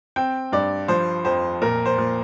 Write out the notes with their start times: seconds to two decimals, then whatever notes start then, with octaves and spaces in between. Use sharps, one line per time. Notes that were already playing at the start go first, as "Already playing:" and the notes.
0.16 C4 G5
0.52 G2 D5
0.88 F3 C5
1.25 F2 C5
1.62 A#2 A#4
1.86 C5
1.98 A#2